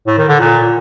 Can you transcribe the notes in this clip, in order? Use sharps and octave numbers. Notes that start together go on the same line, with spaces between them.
A2
D#3
D3
A#2